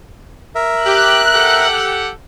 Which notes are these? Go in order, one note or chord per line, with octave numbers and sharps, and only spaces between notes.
A#4 E5
G4 F#6
G4 A4 F#5